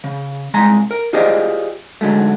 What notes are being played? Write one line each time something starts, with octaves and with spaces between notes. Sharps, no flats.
C#3
C2 G#3 G#5 A#5 C6
A#4
F4 G4 G#4 C5 D5 D#5
G#2 D3 F#3 G#3 A3